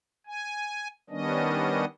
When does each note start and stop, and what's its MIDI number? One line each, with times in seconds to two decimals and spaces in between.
0.26 0.88 80
1.10 1.85 51
1.10 1.85 55
1.10 1.85 59
1.10 1.85 61
1.10 1.85 62
1.10 1.85 75